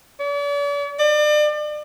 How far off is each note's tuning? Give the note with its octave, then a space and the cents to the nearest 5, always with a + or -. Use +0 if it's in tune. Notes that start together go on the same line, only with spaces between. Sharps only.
D5 -45
D5 +35